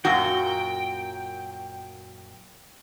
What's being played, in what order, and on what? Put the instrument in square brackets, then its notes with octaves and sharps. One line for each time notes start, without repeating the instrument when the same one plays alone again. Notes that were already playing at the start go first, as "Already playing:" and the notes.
[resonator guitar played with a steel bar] F#2 A#2 F#4 [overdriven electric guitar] G5